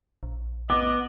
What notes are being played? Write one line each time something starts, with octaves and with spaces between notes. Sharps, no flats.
A#1
B3 D#5 D6